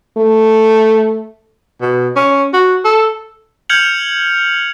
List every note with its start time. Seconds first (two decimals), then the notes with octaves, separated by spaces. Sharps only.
0.18 A3
1.81 B2
2.16 C#4
2.53 F#4
2.85 A4
3.69 F6 G6 G#6 C#7 F7 F#7